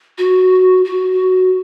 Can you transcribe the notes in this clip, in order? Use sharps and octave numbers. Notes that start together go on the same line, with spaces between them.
F#4
F#4